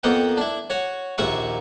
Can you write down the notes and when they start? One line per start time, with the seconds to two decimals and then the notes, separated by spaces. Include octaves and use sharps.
0.03 F2 A#3 B3 F#5 G5
0.37 D4 E4
0.70 F#4 C#5
1.18 A#1 D#2 A#3 E5 F#5 C#6